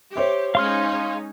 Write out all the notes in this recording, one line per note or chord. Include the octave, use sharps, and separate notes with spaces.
G4 C5 C#5 E5
G#3 C#4 D#4 F5 C6 F6